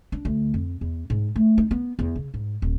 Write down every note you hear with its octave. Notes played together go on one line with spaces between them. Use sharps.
D4
D2
F2
E2
G#2
A3
D#4
B3
E2
C#3
G#2
D#1